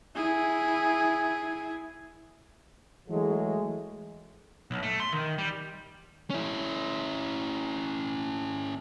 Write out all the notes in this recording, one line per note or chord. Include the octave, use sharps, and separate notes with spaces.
E4 G#4
E3 F#3 G#3 A3 G#4
B1
A3
C6
D#3
G3
C#4 E4